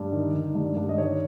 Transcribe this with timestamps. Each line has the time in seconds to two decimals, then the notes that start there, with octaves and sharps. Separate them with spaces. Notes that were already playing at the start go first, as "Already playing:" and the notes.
Already playing: G2
0.12 D#3
0.33 D#3
0.55 G2
0.77 G2
0.89 D#5
0.98 D#3 C#5